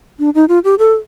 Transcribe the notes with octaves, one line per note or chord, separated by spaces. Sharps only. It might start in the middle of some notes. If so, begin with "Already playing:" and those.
D4
D#4
F4
G4
A4